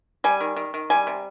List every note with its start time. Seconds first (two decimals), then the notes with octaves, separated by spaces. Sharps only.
0.24 G3 G#5
0.41 D#3
0.56 D#3
0.74 D#3
0.90 G3 G#5
1.07 C3